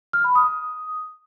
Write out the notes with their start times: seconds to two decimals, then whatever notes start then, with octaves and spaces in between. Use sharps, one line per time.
0.13 F6
0.24 B5
0.35 D#6